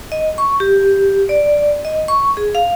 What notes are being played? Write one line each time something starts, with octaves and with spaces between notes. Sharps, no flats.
D#5
C#6
G4
D5
D#5
C#6
G#4
F5